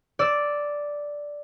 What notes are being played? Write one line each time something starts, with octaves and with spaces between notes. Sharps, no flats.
D5 E6